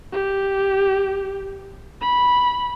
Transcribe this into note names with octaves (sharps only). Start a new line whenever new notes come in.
G4
B5